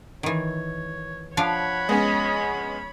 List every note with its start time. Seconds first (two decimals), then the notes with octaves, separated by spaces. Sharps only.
0.23 D#3 E3 C#5
1.37 F3 D4 C#5 F5 F#5 B5
1.89 G#3 B3 C#4 D#5